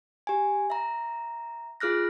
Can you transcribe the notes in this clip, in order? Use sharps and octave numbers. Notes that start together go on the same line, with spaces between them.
G4 G#5
E5 A#5
F4 G#4 F6 F#6 A#6